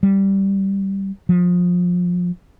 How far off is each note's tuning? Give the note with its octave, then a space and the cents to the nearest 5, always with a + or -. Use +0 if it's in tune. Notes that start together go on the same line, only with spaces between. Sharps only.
G3 -5
F3 +25